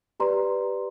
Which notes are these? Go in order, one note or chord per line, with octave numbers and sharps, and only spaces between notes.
G4 B4 D5 A#5 C6